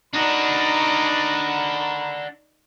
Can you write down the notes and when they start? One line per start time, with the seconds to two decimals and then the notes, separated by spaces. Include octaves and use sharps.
0.13 D4 D#4 F#4 A#4 D5 A#5 B5